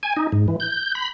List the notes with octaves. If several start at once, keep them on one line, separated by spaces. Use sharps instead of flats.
G#5
D#4
G#2
E3
G6
B5